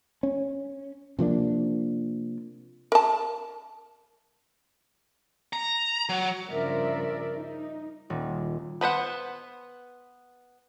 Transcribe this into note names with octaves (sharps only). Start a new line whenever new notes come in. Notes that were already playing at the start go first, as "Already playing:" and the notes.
C#4
C3 F3 A#3 D4
A#4 A5
A#5
F#3
G2 C#3 F3 A#4 D5 E5
D#4
D#1
B3 B4 C5 F#5